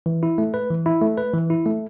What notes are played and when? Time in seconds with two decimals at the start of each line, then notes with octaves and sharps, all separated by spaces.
0.06 E3
0.23 E4
0.38 A3
0.54 B4
0.70 E3
0.86 E4
1.02 A3
1.18 B4
1.33 E3
1.50 E4
1.66 A3